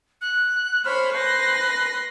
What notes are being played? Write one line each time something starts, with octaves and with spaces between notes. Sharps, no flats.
F#6
C5 C#5 B5 F6
B4 C5 C6 A#6